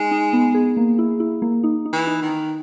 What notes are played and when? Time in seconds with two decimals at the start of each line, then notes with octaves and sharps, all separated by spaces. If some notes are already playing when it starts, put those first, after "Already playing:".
Already playing: G#3 D#4 G#4
0.11 D#4
0.33 B3
0.54 G#4
0.77 A#3
0.99 E4
1.20 E4
1.42 A#3
1.64 D#4
1.86 D#4
1.93 E3
2.07 D#4
2.22 D#3
2.29 D#4